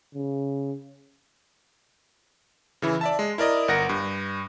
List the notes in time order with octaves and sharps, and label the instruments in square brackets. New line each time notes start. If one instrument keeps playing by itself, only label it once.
[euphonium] C#3
[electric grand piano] C#3 E3 E4
D5 E5 A5
G#3
E4 A#4 D5 D#5
G1 A#4 F#5 A#6 D7
G2